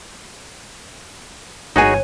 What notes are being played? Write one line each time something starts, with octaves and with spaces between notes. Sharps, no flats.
G1 D#4 F#4 G#4 C#5 G#5